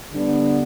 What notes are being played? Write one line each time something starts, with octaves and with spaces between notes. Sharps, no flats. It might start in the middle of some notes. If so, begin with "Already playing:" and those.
D3 G3 B3 D4